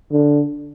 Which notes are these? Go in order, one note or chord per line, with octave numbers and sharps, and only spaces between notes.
D3